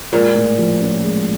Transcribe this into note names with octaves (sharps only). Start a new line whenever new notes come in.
A#2 G#3
A2
F3
C#4
G#3